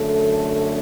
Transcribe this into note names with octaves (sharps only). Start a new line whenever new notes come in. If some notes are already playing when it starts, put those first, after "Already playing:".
Already playing: F#2 D3 A3 A4